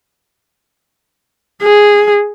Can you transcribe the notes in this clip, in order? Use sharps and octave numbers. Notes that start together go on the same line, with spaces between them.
G#4